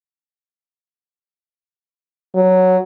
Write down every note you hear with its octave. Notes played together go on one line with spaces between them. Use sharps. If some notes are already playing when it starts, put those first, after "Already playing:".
F#3